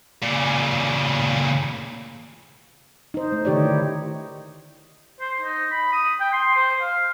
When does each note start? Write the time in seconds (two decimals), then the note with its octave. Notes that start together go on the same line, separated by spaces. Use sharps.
0.23 A#2 C#3
3.14 D#4 C5
3.32 A3
3.45 D3 D#3 D#4 G4 C#5 D5
3.65 E4
5.21 C5
5.41 D#4
5.72 B5
5.93 D#6
6.20 G5
6.33 C6
6.57 C5
6.81 F5